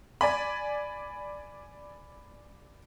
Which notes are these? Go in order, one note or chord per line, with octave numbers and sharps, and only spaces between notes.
D5 G#5 B5